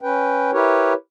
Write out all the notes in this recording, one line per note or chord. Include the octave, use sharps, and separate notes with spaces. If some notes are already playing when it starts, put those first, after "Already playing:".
C#4 B4 G5
E4 G4 A#4 B4 C#5